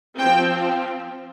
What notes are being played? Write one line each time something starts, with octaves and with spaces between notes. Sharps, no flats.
F3 C4 G5